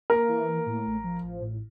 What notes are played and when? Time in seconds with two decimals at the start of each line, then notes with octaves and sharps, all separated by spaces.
0.10 A#3 A#4
0.28 E3
0.48 A#3
0.66 A2
0.86 A1
1.04 F3
1.23 A1
1.41 A2